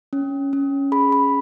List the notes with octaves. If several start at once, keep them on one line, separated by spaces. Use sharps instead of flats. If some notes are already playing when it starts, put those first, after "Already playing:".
C#4
C#4
G#4 B5
B5